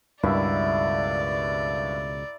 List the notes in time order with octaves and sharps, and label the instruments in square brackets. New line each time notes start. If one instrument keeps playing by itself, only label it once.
[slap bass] C#2 B2 [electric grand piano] G2 [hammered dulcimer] E4 A#4 E5 [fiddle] D5